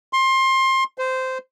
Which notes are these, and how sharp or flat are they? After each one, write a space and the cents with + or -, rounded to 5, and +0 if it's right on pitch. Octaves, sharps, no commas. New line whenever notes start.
C6 +25
C5 -15